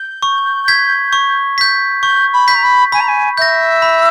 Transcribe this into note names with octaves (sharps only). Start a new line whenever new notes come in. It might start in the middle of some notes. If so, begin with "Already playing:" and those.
Already playing: G6
C#6
G#6 B6
C#6
G6 B6
C#6 G6
B5
G6 B6
A#5
B5
G#5 B5
A#5
G#5
E5 G6 A#6
B5